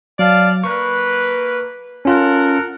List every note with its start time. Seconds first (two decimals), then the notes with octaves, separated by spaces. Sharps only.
0.19 F#3 D5 F5 A5
0.64 A#3 B4 C#6
2.05 C#4 F4 A4 A#4 F#5